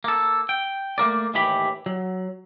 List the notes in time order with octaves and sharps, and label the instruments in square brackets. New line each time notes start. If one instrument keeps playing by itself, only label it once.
[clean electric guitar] A#3 A4
G5
A3 A#3 A#4 D5
D#2 A2 E3 G4 B5
F#3